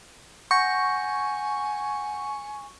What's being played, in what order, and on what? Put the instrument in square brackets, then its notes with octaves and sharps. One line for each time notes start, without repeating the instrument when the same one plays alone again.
[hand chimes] F#5 G6 A#6 [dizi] G#5 [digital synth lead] C#6